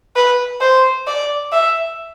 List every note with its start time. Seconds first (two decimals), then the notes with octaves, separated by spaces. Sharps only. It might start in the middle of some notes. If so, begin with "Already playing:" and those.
0.16 B4
0.61 C5
1.07 D5
1.53 E5